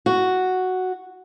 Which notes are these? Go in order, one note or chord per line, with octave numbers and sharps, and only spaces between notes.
F#4